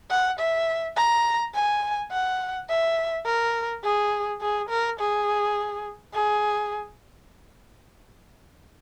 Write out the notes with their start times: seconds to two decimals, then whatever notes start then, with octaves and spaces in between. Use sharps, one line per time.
0.10 F#5
0.39 E5
0.97 A#5
1.54 G#5
2.12 F#5
2.70 E5
3.26 A#4
3.84 G#4
4.41 G#4
4.69 A#4
4.99 G#4
6.14 G#4